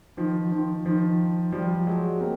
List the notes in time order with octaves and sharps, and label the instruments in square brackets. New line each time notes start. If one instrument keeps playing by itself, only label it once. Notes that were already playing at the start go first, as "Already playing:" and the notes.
[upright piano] D#3 F3
D#3 F3
D#3 F3
F3 G3
F#3 G#3
A#3 C4